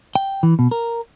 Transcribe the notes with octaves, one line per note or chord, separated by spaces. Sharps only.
G5
E3
B2
A#4